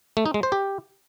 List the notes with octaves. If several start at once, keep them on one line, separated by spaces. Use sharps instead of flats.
A3
D#4
G#3
C5
G4